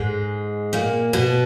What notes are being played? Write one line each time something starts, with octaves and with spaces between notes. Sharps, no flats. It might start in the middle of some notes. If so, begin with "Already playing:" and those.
Already playing: G#2 G#3
A#2 A#3
B2 B3